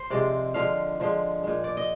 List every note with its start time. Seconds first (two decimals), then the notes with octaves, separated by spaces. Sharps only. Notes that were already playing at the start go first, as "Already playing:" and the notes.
Already playing: C5
0.10 C3 F3 G#3 D5
0.54 D3 F3 G#3 F5
1.00 D3 F3 G#3
1.44 A#2 G#3
1.64 D5
1.77 D#5